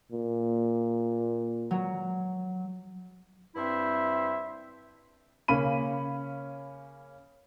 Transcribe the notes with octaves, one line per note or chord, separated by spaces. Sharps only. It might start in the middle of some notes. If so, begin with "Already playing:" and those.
A#2
F#3
G2 C4 E4 C5 E5
C#3 A#3 C#4 B5 D#7